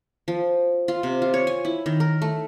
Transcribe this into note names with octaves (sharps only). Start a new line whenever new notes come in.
F3
F4
C3
F4
C#5
G#5
E4
D#3
A#4
A3